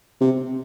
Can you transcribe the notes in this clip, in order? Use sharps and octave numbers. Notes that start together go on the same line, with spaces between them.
C3